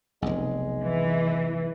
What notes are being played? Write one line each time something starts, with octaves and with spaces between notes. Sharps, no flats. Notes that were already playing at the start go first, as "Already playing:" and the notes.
F1 B1 G#3
E3